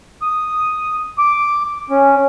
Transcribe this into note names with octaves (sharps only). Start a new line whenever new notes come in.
D#6
D6
C#4